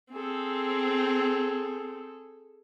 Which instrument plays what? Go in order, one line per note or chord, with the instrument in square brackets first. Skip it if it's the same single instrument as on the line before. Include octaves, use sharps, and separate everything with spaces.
[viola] C4 [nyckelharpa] G#4 A4